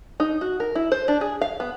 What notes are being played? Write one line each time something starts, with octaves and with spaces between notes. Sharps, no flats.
D#4
F#4
A#4
E4
C5
D4
G#4
F5
B3